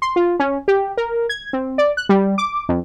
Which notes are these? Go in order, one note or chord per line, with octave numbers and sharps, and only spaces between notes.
C6
F4
C#4
G4
A#4
G#6
C4
D5
F#6
G3
D6
F2